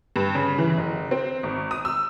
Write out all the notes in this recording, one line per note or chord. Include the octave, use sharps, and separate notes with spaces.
G2
C#3
E3
F#1
C4
G#1
D#6
E6